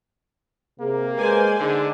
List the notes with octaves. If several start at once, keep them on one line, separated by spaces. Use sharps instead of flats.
C3 A#3 G#4
G#3 B4 C5 D5 G#5
D3 D#4 G#4